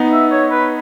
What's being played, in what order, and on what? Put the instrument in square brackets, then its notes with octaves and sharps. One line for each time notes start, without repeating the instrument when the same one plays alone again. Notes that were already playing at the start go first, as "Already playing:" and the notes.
Already playing: [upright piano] B3 D#4
[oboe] E5
C#5
B4